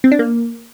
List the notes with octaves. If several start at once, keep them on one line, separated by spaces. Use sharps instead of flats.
C4
D4
A#3